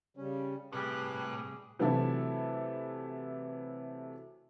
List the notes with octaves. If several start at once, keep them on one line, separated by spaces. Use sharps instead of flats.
C#3 G3 C#4
A2 C3 G3 G4 G#4 B4 F#6
C3 E3 F#3 A3 E4 A4